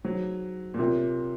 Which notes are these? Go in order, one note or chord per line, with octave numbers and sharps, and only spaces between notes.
F#3 D#4 G#4 C5
A#2
C3 F4 A#4 C#5